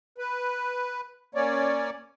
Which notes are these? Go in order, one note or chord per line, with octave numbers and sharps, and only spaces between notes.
B4
A#3 C#4 C#5 D5